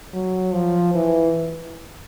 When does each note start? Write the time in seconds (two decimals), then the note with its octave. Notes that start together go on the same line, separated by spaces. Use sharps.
0.14 F#3
0.53 F3
0.94 E3